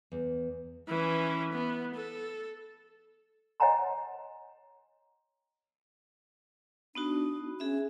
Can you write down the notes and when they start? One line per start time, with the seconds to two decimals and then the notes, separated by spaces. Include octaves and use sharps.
0.12 E2
0.88 E3 C#4
1.52 B3
1.95 A4
3.60 C#5 D#5 F#5 G#5 A#5 C6
6.95 B3 D4 D#4 F#4
7.60 C#4 G#4 E5